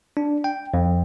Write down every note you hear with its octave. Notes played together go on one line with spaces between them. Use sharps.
D4
G5
F2